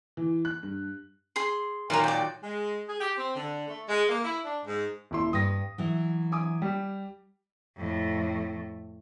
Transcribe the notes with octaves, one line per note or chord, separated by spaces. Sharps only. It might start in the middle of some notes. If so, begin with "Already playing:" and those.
E3
F#6
G2
G#4 C6
A#2 D#3 F#3 F4 A#4
D5 G5
G#3
G#4
G4
C4
D3
A3
G#3
A#3
E4
D4
G#2
D#1 E4 C6
G2 B4 D#6 A#6
E3 F#3
G#5 D6 D#6
G3 G4
F2 A2